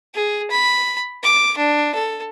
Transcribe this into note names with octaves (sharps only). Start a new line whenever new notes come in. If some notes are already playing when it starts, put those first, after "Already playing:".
G#4
B5
D6
D4
A4